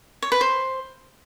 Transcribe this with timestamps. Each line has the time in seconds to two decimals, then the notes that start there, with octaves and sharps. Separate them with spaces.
0.22 C#5
0.32 B4
0.41 C5